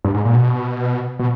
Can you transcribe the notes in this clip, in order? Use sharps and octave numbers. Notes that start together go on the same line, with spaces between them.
G2
G#2
A#2
B2
B2